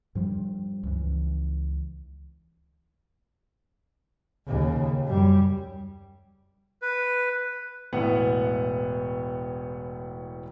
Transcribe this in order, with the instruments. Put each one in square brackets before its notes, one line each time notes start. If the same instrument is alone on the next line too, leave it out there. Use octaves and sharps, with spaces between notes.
[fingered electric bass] G2 F3 G3
C#2 E3
[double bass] D#2 C#3
F#2 G3
[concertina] B4
[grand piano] E1 A2 B3 F#5